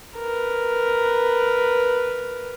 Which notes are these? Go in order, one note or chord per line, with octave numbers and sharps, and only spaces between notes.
A#4 B4